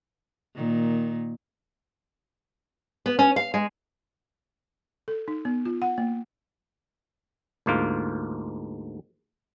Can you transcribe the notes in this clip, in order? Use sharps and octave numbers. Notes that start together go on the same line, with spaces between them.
A#2 D#3
B3
C#4
F5
G#3
A4
D#4
B3
F4
F#5
A#3
D2 G#2 A#3 F4